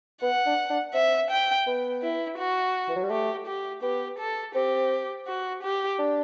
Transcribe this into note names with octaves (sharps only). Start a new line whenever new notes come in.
B3 F#5
D4
D4
C4 E5
G5
B3
E4
F#4
E3
F#3
G3
A3 G4
G4
B3 G4
A4
C4 G4
F#4
G4
D4